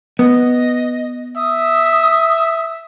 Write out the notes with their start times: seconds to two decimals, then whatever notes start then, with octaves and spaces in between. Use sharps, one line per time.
0.19 B3 D#5
1.37 E5 D#6